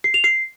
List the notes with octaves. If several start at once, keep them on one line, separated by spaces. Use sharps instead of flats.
C7
F7
C7